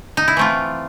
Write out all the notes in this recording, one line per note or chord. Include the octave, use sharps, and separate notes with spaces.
D#4
E4
E3 A3 C4 F4